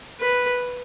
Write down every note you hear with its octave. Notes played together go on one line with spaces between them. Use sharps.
B4